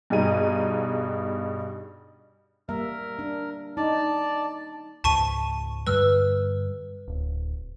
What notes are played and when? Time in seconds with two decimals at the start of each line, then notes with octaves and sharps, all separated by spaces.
0.10 G2 B2 D#4 G#4 A#5 D#7
2.69 G3 A#3 A#4 E5
3.19 D4
3.77 D#4 D5 A5
5.04 C#2 G#2 A5 C#6 D#7
5.87 G2 D3 G3 B4 E6 F6
7.08 D1